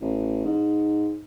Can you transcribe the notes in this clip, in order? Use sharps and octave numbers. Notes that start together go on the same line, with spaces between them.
A1
G#2